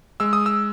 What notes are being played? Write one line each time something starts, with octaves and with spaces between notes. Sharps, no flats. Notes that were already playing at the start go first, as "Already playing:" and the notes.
G#3 E6
D#6
E6